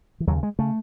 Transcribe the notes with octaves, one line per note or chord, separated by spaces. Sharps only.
E3
D#2 C#3 F#3
G#3
C#3 A3